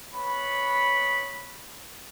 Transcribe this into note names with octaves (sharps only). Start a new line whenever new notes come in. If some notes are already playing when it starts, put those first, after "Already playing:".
B3 C#5 B5